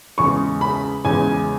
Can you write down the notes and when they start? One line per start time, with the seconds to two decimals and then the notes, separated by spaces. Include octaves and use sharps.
0.18 E2 C#3 G#3 C#6
0.61 B5
1.05 E2 C#3 G#3 G#5